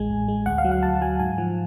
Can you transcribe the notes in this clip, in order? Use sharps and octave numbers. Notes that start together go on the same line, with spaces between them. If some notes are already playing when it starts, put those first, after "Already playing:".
Already playing: A1 G#3 G#5
A1
G#3
D2 F#5
F5
F#3
F#5
D2 A5
F#3 G#5
G#2 G#5
F3